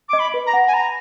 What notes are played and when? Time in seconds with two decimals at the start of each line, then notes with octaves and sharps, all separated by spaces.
0.09 D#5 D6
0.19 B5
0.34 B4
0.46 A#5
0.53 F#5
0.68 G#5
0.73 A#5 B5